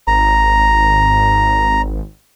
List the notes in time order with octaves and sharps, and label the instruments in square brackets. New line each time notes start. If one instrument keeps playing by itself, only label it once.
[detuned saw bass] G#1 [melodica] A#5